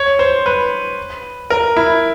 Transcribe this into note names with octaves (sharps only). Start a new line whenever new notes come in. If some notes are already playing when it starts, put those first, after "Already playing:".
Already playing: C#5
C5
B4
A#4
E4